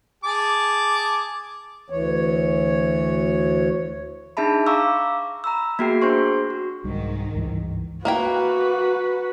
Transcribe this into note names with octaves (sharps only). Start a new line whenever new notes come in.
G#4 A5 D6
D2 E3 C#5
D4 D#4 G#4 E5 A5 B5
F5 A#5 C#6 D6 E6
A#5 B5 E6
A#3 B3 F#4 G#4 G5 C7
D4 G#4 C5 C6 C#6
F#4
C2 G#2 D#3 G3
C#2 G2 E3
A#3 E4 F#4 B4 G5